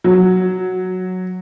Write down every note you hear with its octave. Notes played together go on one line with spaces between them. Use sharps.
F#3